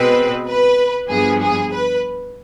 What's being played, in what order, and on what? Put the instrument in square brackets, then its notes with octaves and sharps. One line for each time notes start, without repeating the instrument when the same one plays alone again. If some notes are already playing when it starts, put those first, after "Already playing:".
Already playing: [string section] B2 G#3 C4 B4
B4
G2 F3 B3 G#4
G#4
B4